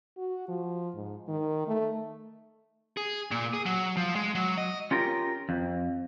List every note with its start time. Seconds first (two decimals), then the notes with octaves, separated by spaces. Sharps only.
0.17 F#4
0.48 F3
0.95 G#2
1.28 D#3
1.67 A3
2.97 G#4
3.31 A#2
3.53 G#4
3.66 F#3
3.97 F3
4.15 G#3
4.35 F#3
4.58 D#5
4.91 C#4 F4 G4 A#4
5.49 F2